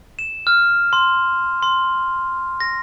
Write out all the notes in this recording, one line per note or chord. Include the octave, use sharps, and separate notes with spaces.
E7
F6
C6
C6
A#6